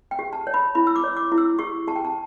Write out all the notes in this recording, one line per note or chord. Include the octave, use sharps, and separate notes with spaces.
G5
G4
A5
C#5
B5
E4 B5
E6
D6
C#5
D6
E4
E6
G4 C#6
G4 A5
G5
A5